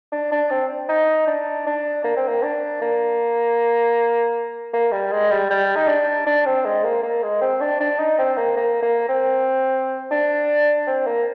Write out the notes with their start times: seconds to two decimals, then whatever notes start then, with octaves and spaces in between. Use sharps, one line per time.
0.12 D4
0.32 D4
0.51 C4
0.89 D#4
1.27 D4
1.67 D4
2.04 A#3
2.16 C4
2.28 A#3
2.42 D4
2.82 A#3
4.73 A#3
4.92 G3
5.12 G#3
5.31 G3
5.50 G3
5.76 D#4
5.88 D4
6.26 D4
6.46 C4
6.65 G#3
6.84 A#3
7.03 A#3
7.23 G#3
7.41 C4
7.61 D4
7.80 D4
8.00 D#4
8.18 C4
8.37 A#3
8.57 A#3
8.82 A#3
9.08 C4
10.11 D4
10.87 C4
11.07 A#3